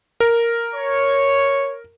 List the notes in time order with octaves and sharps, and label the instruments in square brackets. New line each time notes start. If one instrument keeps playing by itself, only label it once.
[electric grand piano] A#4
[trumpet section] C#5